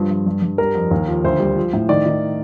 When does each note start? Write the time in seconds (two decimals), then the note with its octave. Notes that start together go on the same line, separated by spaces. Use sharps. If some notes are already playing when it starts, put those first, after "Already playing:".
Already playing: G2 F3
0.10 G2
0.27 G2
0.42 G2
0.58 G3 A#4
0.75 F2
0.91 D#2
1.08 F3
1.24 D2 C5
1.40 G3
1.56 F3
1.74 A2
1.89 D#3 D5
2.06 D#3